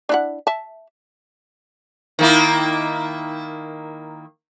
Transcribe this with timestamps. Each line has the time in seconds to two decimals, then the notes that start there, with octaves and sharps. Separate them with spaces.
0.09 D4 E4 F#5
0.47 E5 A5
2.19 D#3 A#3 E4